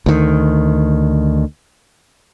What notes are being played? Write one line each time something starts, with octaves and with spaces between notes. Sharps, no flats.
D2 D#3